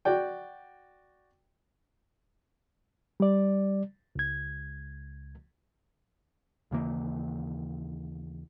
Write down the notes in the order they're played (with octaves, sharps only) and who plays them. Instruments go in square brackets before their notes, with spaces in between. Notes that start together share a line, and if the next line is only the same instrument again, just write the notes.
[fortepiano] F#4 D5 G5
[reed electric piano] G3 D5
C#2 G#6
[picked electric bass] D#2 C#3 E3 A#3